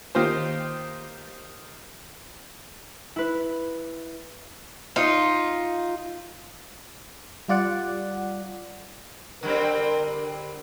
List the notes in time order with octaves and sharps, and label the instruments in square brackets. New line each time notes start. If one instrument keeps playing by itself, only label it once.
[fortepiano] D#3 A#3 F4 G4 C5
[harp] E4 B4
[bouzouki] D#4 F4
[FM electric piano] G3 F4 D5 F#5
[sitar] D3 G3 C4 [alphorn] A#4